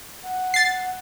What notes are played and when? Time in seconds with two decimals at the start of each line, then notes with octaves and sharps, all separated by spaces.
0.24 F#5
0.54 A6 C7